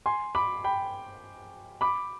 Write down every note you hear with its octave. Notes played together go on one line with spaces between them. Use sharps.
G#5 C6
B5 D6
G5 B5
B5 D6